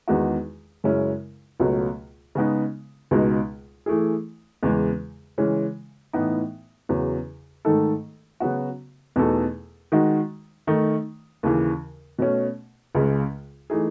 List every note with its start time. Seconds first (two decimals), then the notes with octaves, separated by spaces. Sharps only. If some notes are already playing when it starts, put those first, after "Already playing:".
0.08 E2 D#3 G#3 D#4 F#4
0.84 F#2 C#3 G#3 C#4 E4
1.60 C#2 B2 F#3 A3
2.35 C#3 G#3 B3 D#4
3.11 C#2 B2 G#3 D#4
3.86 E3 A3 E4 G#4
4.63 E2 C#3 E3 G#3
5.38 C#3 E3 G#3 C#4
6.13 A2 E3 B3 D#4
6.89 E2 C#3 F#3
7.65 G#2 D#3 A3 D#4 A4
8.40 C#3 F#3 B3 F#4
9.16 E2 B2 A3 D#4 A4
9.92 D#3 G#3 D#4 F#4
10.67 D#3 A3 D#4
11.43 D#2 C#3 E3
12.19 B2 A3 C#4
12.95 C#2 C#3 G#3
13.70 E3 A3 D#4 G#4